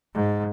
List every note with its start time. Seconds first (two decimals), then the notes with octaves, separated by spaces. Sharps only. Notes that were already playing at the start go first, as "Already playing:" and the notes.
0.14 G#2